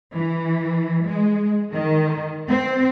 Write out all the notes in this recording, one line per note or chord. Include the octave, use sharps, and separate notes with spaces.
E3
G#3
D#3
C4